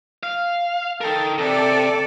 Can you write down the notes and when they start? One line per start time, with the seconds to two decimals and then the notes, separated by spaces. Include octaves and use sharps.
0.23 F5
1.01 A4 A#4 G5
1.38 C3 A4 D5